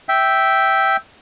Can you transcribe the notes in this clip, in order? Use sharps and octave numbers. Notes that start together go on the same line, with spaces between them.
E5 G5